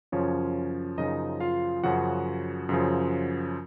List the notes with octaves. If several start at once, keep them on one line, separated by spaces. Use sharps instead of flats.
F#2 C#3 F3 C#4 C#5
F#2 C#3 F3 D#4 D#5
F4 F5
F#2 C#3 F3 F#4 F#5
F#2 C#3 F3